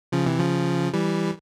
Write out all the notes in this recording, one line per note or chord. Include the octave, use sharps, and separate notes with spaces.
C#3 F3
C3 E3
C#3 F3
E3 G3